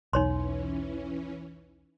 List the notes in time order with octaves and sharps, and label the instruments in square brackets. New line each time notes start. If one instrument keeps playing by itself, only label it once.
[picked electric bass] B1 E2 [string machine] E3 C#4 [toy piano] D#4 C#5 C6